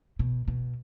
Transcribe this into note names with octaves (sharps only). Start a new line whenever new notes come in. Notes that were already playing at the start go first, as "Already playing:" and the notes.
B2
B2